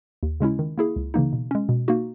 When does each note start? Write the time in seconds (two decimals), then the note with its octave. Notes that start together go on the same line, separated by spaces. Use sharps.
0.23 D#2
0.40 C#3 G#3 C#4 E4
0.59 D#3
0.78 A#3 E4 G#4
0.96 C#2
1.14 C#3 E3 A#3 D#4
1.33 B2
1.51 G#3 C#4
1.69 B2
1.88 A#3 D#4 F#4